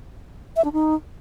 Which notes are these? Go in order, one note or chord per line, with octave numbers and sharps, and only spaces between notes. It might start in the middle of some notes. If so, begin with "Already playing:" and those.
E5
D4
D#4